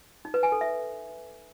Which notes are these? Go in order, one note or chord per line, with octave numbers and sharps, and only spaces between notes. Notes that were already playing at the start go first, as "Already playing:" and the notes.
D#4
B4
G#5
A4
E5